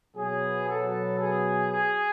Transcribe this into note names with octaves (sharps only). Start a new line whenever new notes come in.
B2 F#3 B3 G#4
A4
G#4
G#4